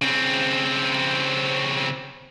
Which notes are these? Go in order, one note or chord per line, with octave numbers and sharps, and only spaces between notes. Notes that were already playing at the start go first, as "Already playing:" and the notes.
C#3 C4